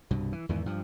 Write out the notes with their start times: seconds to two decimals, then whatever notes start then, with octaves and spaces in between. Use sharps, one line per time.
0.11 C2 G2 B2
0.33 E3
0.49 E2 G#2 D#3 E3
0.66 G2 F3